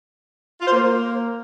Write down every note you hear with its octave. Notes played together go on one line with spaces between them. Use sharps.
F4
C5
A#3